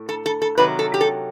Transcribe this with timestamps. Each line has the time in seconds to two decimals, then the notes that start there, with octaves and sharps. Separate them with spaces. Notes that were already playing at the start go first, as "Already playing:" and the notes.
Already playing: A2
0.09 A4
0.26 A4
0.42 A4
0.58 C3 D#3 F#3 B4
0.79 A4
0.94 G4
1.01 A4